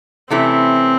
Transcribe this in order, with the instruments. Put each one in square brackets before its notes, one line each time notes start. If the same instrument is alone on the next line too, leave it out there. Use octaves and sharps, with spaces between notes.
[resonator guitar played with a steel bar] C3 E3 A3 C#4 E4 [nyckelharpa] C4